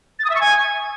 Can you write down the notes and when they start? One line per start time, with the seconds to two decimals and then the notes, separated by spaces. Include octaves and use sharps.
0.19 A6
0.25 D#6
0.30 E5
0.35 C#6
0.41 G#5